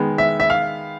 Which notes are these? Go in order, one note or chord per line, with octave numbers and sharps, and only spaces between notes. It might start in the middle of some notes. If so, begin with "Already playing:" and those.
Already playing: D#3 G#3 B3
E5
E5
F5